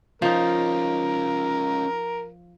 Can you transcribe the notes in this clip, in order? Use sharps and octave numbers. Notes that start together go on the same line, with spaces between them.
F3 C#4 D#4 F4 A#4